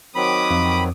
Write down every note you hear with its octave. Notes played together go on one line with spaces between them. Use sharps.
D#3 F#3 C4 B5 D6 D#6
F2